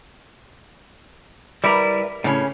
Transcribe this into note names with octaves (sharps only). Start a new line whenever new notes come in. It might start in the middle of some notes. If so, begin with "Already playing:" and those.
G3 E4 A#4 B4 D5
A2 C#3 C#4